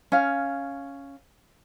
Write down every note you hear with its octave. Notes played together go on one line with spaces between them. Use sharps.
C#4 F5